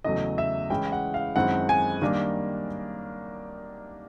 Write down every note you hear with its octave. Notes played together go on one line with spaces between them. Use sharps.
E2 C#3 F#3 A3 D#5
E5
E3 G#3 C#4 E4 G5
F#5
F5
F#2 D#3 G#3 C4 E4 F#5
G#5
D#3 G3 A#3 D4